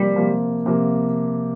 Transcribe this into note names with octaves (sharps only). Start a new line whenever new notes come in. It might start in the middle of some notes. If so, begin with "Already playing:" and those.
Already playing: C3 F3 G3 A#3
C3 F3 A#3
C3 F3 A#3